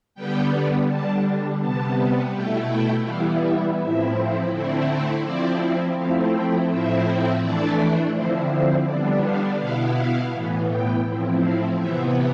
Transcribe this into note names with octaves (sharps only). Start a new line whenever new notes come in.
D3 G3 B3 G5
D3 G3 D4 A5
C3 G3 B3 A5
B2 A3 E4 G5
G5
E3 G3 B3 E4 F5
E5
A2 F3 C4 E4 E5
D3 A3 C4 E4
F3 C4 E4 D5
F3 A3 C4 E4 F5
G5
A2 F3 C4 E4 E5
E3 A3 D4 D5
D3 F3 C4 E4 C5
C5
D3 G3 B3 D4 D5
F5
B2 B3 E4 F5
F5
A2 E3 B3
G5
A2 F3 C4 E4
F5
C3 E3 B3 E5